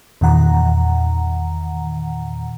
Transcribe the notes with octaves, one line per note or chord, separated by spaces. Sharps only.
E2 A#2 D#3 F#5 A#5